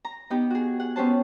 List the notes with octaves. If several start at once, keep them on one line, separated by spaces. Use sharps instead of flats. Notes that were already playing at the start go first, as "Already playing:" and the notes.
A#5
B3 D#4 G4
F#4 G#4
G#4 F#5
B3 C#4 G4 C5 A5